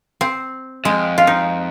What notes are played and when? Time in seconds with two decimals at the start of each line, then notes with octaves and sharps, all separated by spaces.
0.21 C4
0.85 F2 G#3
1.18 F4
1.27 D#4